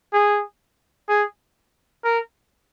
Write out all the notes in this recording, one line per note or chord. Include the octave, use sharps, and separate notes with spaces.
G#4
G#4
A#4